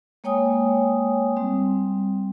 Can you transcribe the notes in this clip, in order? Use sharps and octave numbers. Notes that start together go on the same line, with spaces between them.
G#3 A#3 C#5 G5 G#5 D#6
G3 C4